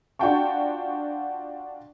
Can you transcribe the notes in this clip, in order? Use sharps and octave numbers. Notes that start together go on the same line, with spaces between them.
D4 F4 F#4 G5 A5 C#6